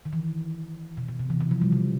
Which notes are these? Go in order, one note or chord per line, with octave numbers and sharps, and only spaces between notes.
D#3
E3
B2
B2
C3
E3
E3
F3
G3
C#3